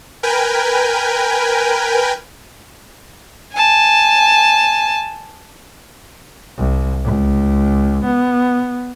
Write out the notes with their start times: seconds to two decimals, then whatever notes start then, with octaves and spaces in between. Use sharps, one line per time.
0.23 A#4 B4 G5 G#5
3.53 G#5 A5
6.58 C2
7.04 C#2
8.05 B3